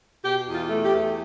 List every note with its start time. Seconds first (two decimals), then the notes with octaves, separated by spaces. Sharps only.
0.24 B2 G4
0.47 E2
0.54 F4
0.69 A3
0.84 G4
0.91 E2